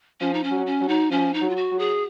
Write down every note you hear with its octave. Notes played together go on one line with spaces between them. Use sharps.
F3 C#4
D#4
C#4
F#3
C#4
F#3
D#4
F3 C#4
D#4
F#3
F4
F#4
F#3
G#4